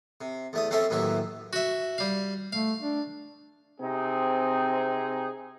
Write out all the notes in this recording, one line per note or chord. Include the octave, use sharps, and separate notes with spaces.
C3
E2 A3 D#6
F3 C4 C#4 A4 E5
A1 D#2 A2 E3 F#3 E5
F#4 E5
G3 F5
A3 F5
D4
C3 C4 D#4 G#4